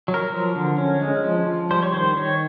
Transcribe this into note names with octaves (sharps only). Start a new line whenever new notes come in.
F#3
A#4
F3
D3
C#4
G#3
F3
F3
G3 C5
C#5
D#3 C5
D#3 C#5